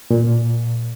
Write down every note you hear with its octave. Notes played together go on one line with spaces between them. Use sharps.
A#2